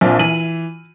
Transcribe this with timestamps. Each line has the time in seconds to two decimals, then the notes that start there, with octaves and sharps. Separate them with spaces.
0.01 A#1 C4 D4 F4
0.19 E3 D#7 F#7